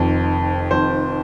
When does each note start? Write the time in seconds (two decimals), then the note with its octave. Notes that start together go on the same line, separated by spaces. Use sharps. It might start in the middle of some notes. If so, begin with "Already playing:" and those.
Already playing: F1 F2 D#3
0.71 F1 F2 D#3 C5